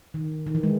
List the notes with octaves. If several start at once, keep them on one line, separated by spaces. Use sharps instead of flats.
D#3
D#3
E3
G#3